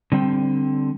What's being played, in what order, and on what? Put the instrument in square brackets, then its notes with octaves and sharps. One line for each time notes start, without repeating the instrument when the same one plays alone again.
[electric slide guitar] D3 G3 C4 G5